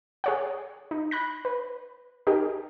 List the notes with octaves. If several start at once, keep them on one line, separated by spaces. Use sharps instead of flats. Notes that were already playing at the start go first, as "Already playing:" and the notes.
G#4 C#5 F#5
D#4
B5 F#6 A#6
B4
D#4 G4 G#4 A#4